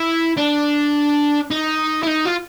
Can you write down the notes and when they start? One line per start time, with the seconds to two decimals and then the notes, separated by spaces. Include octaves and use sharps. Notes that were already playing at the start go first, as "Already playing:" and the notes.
Already playing: E4
0.37 D4
1.51 D#4
2.03 E4
2.07 D#4
2.26 F4